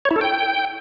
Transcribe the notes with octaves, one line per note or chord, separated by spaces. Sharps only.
C#5
E4
A4
G5